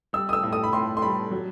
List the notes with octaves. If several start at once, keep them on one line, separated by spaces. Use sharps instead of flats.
G3 E6
D#6
E6
A2
D#6
B5
A2 C6
C6
G3 B5
F#3